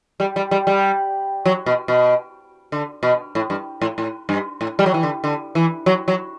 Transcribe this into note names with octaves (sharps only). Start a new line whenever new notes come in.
G3
G3
G3
G3
F#3
B2
B2
D3
B2
A2
G2
A2
A2
G2
A2
G3
F#3
E3
D3
D3
E3
F#3
F#3